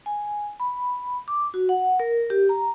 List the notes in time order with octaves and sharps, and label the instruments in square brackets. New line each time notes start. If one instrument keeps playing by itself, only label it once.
[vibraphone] G#5
B5
D6
F#4
F#5
A#4
G4
A#5